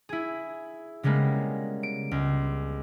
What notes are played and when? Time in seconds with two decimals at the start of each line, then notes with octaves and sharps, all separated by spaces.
0.09 E4 G#4
1.03 C#3 G3 G#3 A#3 B3
1.83 D7
2.11 C#2